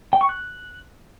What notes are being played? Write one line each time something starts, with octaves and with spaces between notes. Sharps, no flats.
G5
C#6
F#6